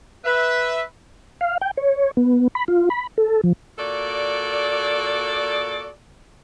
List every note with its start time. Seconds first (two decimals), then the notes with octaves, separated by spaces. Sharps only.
0.24 B4 E5
1.41 F5
1.61 G5
1.77 C#5
2.17 B3
2.55 B5
2.68 F4
2.90 B5
3.18 A4
3.44 F3
3.77 A#2 F#4 A4 D5